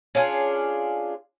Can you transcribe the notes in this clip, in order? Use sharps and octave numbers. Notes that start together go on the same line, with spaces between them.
C#4 D4 F4 G#4